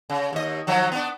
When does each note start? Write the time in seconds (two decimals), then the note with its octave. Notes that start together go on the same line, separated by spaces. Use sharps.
0.10 C#3
0.33 D#2 D#5
0.67 D#3 F3 F#3
0.92 B3 D4